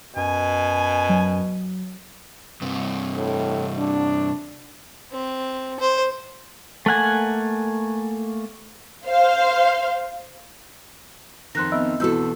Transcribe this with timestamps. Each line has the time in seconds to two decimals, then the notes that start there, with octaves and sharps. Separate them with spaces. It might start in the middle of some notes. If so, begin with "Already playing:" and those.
0.16 F#2 B2 G#5
1.09 F#3
2.62 G2 C3
3.16 A2
3.78 D4
5.12 C4
5.80 C5
6.86 A3 A#3 F#5 G#5
9.06 C5 F5
11.55 F2 D#3 C6 F#6 A#6
11.72 B3 C4 D#5 E5 E6
12.00 E2 B2 E4 F#4 A4 E6 G6